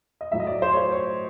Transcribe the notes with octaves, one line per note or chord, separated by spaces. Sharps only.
D#5
A2 F#3 A3 E5
D#5
D5
C5
C#5
C5
C#5